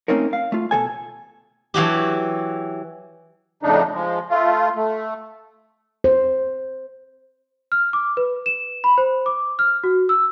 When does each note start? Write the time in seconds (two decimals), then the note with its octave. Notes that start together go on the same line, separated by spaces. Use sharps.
0.08 A3 A#3 C4 C#4 D#4 A#4
0.33 F5
0.52 A3 F4
0.71 B2 D#3 A4 G#5
1.74 E3 F#3 F#4 G4
3.63 F2 A2 C#3 D4 D#4
3.94 F3 G#3
4.30 A3 F4
4.76 A3
6.04 C5
7.72 F6
7.93 D6
8.17 B4
8.46 E7
8.84 B5
8.98 C5
9.26 D6
9.59 F6
9.84 F#4
10.09 E6